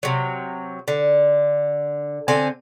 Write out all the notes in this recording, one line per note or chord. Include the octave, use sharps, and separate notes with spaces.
C3 F#3
D3
D3 C4 A4 G#5